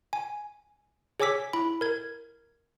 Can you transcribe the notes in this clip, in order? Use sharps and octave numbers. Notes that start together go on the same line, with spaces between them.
G#5
G#4 C#5 G#5 D6 E6 B6
E4 B5
A#4 G#6